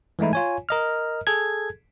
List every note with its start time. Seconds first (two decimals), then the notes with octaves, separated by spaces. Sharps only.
0.19 E3 G#3 A3 D#4 E4
0.33 F4 C#5 G#5
0.69 A#4 D#5 F6
1.27 G#4 A4 G#6